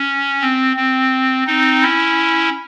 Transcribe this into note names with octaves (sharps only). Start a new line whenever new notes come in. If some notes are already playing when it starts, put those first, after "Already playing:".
Already playing: C#4
C4
C4
C4 D#4
C#4 E4